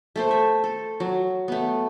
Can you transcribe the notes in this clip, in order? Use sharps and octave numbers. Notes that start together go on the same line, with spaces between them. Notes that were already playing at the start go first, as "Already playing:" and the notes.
A3 A4 C5
E5
A4
F#3
A3 B3